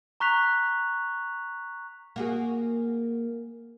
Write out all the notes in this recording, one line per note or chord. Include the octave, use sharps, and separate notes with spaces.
A#5 C#6 F#6 B6 F7
A#3 F#4 G#4